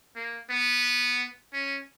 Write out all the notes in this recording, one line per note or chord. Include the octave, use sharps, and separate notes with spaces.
A#3
B3
C#4